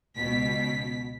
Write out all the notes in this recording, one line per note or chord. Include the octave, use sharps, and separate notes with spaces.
C#2 B2 B6